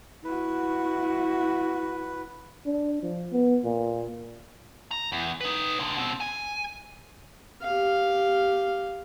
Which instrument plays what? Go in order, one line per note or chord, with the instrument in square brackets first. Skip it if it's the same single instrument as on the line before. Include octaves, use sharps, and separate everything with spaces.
[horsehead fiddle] E4 F#4 [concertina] B4
[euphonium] D4
F3
B3
A#2
[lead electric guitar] A#5
E2
D#4 B4
A#2 D3
B2 C4
G#5
[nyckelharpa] G4 F5